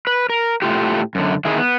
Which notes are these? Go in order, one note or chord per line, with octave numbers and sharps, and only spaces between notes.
B4
A#4
A2 A3 F4 G4
F#2 D3
D#3 G#3 E4 G#4
B3